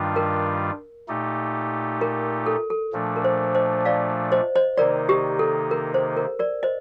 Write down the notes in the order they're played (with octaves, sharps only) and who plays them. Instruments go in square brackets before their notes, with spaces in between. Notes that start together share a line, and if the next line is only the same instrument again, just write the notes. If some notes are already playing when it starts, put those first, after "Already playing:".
Already playing: [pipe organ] G2 D#3 G3 D4 F4
[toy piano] A#4
[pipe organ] A#2 A3 D#4 G4
[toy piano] A#4
A4
A4
[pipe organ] A#2 F3 A3 D4
[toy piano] A#4
C5
C5 D#5
D5 F5
C5 D#5
C5 D#5
[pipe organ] C3 D#3 A#3 D#4 [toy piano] A#4 D5
[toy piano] G4
A4
A#4
C5
A#4
A#4 D5
C5 D#5